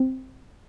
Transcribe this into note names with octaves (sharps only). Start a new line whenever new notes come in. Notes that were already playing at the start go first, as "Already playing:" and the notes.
Already playing: C4